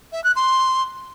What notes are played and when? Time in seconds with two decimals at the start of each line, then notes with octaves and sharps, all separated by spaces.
0.12 E5
0.24 F#6
0.36 C6